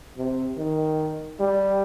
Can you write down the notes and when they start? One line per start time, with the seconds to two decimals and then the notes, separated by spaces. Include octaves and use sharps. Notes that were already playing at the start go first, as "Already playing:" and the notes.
0.18 C3
0.58 D#3
1.40 G3